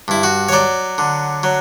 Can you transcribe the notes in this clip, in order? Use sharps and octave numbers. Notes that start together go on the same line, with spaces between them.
G2 E4
F#4
C#5
F#3 D5
D3
F#3